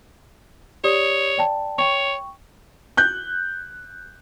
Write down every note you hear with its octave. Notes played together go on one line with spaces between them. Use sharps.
G4 C#5 D5 D#6
D5 G5 A5
C#5 G5 C#6
F#6 G6